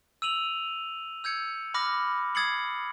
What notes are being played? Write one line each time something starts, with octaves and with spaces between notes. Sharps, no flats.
E6 D#7 F7 F#7
E6 G6 G#6 C#7
B5 D6 F6 A#6
D#6 G#6 A6 C7 C#7 F#7